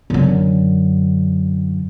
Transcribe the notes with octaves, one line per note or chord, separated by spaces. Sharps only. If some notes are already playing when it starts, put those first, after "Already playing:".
F#2 D3